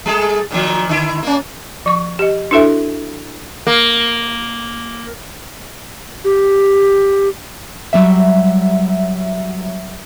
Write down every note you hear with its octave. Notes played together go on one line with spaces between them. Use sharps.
G3 G#4 A4
A#2 D#3 F3
D3 E4
A#3 C#4
F3 C#6
G4 D#5
D4 E4 F#4 A4 E5
A#3
G4
F#3 G3 E5